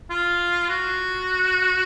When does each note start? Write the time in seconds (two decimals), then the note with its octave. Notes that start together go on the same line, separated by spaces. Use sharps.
0.10 F4
0.69 F#4